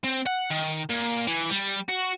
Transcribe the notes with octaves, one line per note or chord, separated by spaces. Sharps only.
C4
F#5
D#3
A#2
E3
G3
F#4